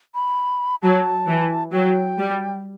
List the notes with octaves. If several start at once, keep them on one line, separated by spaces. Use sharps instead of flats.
B5
F#3 A5
E3
F#3 G5
G3